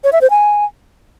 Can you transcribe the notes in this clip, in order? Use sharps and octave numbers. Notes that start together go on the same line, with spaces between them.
C#5
E5
C5
G#5